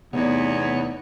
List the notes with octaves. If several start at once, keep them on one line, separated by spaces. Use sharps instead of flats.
E2 C3 A3 B3 D#4 C#5 D5